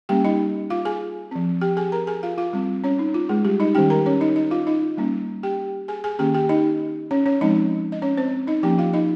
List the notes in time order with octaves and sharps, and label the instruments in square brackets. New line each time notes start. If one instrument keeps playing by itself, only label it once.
[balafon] G3 A#3 C#4 G4 G5
D#4 D#5
F4 F5
G#4 G#5
F3 C4
G4 G5
G#4 G#5
A#4 A#5
G#4 G#5
F4 F5
F4 F5
G3 C4
C#4 C#5
D#4
F4
G#3 G#4
G3 G4
D#4 D#5
D#3 G3 C#4 G4 G5
A#4 A#5
C#4 C#5
D#4 D#5
D#4 D#5
F4 F5
D#4 D#5
G3 A#3 C#4
G4 G5
G#4 G#5
G#4 G#5
D#3 A#3 C#4 G4 G5
G4 G5
D#4 D#5
C#4 C#5
C#4 C#5
F3 G#3 C4 D#4 D#5
D#5
C#4 C#5
C4 C5
D#4 D#5
F3 A#3 C#4 G4 G5
F4 F5
D#4 D#5